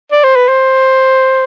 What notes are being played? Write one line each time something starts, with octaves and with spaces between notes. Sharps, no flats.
D5
C5
B4
C5